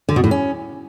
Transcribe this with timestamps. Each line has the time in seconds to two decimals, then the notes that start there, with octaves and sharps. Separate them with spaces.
0.09 D3
0.16 B2
0.24 A2
0.31 C#4